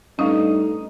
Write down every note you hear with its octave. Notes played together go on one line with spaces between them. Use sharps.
G2 A3 C#4 D#4 F5 D#6